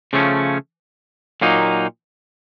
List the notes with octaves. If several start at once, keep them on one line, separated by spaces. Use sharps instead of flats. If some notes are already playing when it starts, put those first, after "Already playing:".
C#3 F3 A3 C#4
A#2 F#3 A#3 D#4